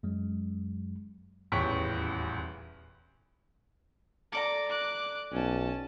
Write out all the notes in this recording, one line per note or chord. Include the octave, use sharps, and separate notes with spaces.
F#2 F#3 G#3
D#1 A1 E2 G5 C#6 B6
A4 D5 A#5 D6
D6 F#6
B1 C#4 A5